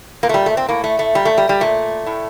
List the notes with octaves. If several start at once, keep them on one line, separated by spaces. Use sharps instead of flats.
A#2 A#3
A3
G3
A3
C4
A2 A#3
A3
A3
A#2 G3
A3
G3
G3
A#2 A3
A2